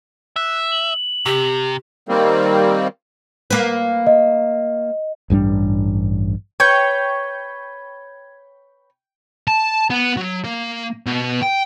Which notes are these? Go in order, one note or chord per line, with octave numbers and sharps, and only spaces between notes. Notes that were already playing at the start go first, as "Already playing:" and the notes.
E5 F#6
F#7
C3 G4
D#3 G3 A#3 C4
A#3 B4
D#5
A1 G2 G3 D4
B4 C#5 G5 C#6 G6 G#6
A5
B3
F#3
A#3
B2
G5